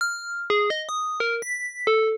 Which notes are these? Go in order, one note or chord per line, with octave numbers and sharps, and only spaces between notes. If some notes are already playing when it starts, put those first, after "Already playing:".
F6
G#4
D#5
D#6
A#4
B6
A4